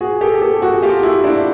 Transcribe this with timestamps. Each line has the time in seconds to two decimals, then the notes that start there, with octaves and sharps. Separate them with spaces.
0.01 F#4 G#4
0.21 G4 A4
0.41 G4 A4
0.62 F#4 G#4
0.82 F4 G4
1.03 E4 F#4
1.24 D4 E4